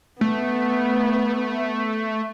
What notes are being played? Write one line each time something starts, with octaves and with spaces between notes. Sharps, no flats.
A3 B3